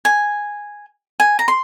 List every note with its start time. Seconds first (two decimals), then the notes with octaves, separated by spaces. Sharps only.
0.05 G#5
1.20 G#5
1.39 A#5
1.48 C6